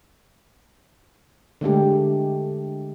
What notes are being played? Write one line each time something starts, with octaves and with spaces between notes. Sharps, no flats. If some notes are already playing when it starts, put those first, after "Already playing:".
D3 G#3 A3 G4